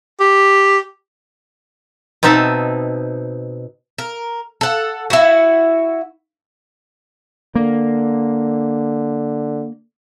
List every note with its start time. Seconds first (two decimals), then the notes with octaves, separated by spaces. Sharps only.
0.20 G4
2.23 B2 C4 D#4 E5 A5
3.98 A#4
4.61 A4 F#5
5.10 E4 F#4
7.55 D3 A#3